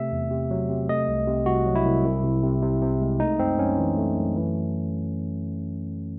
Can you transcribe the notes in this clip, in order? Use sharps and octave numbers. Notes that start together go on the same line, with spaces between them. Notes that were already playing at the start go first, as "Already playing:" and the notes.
Already playing: C3 A3 E5
E2
C3
F#3
C3
A3 D#5
C2
C3
C2 F#4
F#3
E4
C2
C2
C3
C3
C3
C3
G#3
A3 D#4
F#2 C4
F#2 C#4
E3
A3
F#2
E3